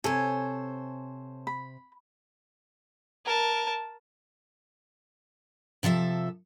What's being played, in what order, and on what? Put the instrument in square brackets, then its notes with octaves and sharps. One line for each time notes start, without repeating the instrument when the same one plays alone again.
[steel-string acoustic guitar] C3 C5 [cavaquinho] A4 C#5 G#5
[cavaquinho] B5
[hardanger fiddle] A#4 A5
[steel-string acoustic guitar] C3 F3 A4 E5